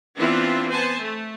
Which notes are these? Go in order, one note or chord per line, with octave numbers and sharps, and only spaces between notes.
E3 B3 C4 D4 E4 F4
B3 C5 G#5 A5
A3